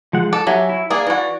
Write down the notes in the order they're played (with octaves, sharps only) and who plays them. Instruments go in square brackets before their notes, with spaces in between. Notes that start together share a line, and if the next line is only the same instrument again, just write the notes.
[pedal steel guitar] F3 G#3 F#5
[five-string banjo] A4 [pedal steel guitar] A5 D6
[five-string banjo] F#3 [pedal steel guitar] G4 E5 G#5
[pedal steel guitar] E4
[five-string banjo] A#3 G#4 [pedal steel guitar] D5
[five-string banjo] E3 F#4